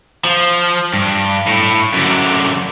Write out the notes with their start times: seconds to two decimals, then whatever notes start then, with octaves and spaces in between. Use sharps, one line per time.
0.25 F3
0.94 G2
1.47 A2
1.94 F#2 D3